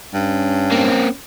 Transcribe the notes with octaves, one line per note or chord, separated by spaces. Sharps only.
G2 C#4
A#3 C4